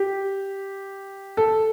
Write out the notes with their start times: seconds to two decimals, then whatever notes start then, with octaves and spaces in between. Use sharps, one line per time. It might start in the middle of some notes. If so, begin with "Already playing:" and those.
Already playing: G4
1.37 A4